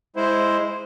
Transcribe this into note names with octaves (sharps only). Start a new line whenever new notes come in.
G#3 E4 C5